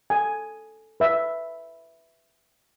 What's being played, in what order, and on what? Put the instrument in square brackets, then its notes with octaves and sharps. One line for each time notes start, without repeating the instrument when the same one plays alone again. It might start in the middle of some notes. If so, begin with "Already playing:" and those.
[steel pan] A4 G#5
B4 E5